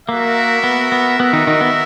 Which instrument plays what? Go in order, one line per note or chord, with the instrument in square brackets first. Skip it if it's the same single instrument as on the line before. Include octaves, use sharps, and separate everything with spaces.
[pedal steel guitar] A#3 [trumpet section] F#4 A#4 E5
[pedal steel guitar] B3
B3
[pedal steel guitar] B3 [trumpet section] F#4 A#4 E5
[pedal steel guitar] D#3 D#4
D#3 D#4
B3